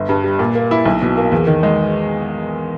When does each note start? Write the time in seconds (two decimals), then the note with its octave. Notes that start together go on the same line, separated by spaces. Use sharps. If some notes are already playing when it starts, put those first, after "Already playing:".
Already playing: G1
0.09 G2
0.24 G3
0.39 A#2
0.55 A#3
0.71 E4
0.86 B1
1.02 B2
1.17 A#3
1.32 E2
1.47 D#3
1.63 G#3